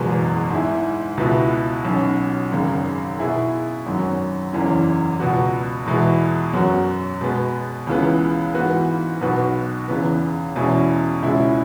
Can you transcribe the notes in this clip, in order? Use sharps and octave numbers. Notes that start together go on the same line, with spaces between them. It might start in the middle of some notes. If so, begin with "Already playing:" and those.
Already playing: F#1 E2 B2 G#3 B3
G#2 G#3 E4
C#2 B2 B3 E4
B1 B2 F#3 C#4
G#1 F#2 C#3
B2 B3 E4 G#4
G#1 F#2 F#3
F#1 E2 E3 C#4
C#2 B2 B3 F#4
E2 B2 G#3 E4 B4
F#2 F#3 B3 F#4
B2 G#3 B3
C#2 C#3 E3 B3
G#2 E3 B3 F#4 B4
B1 B2 B3 F#4 B4
E2 C#3 E3 B3
E2 B2 G#3 C#4 E4
C#2 B2 G#3 C#4 E4